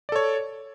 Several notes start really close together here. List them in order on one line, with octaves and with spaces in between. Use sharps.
D5 A4 C#5